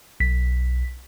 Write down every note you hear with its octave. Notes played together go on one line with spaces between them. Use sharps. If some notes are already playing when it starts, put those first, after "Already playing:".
B1 B6